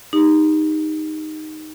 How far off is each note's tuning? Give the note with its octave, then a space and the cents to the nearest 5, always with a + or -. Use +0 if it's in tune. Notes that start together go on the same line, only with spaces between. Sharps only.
D#4 +0 G4 +30